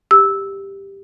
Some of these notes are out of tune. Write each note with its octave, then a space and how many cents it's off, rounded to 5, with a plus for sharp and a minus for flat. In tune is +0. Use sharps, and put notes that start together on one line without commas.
G4 +5 E6 -10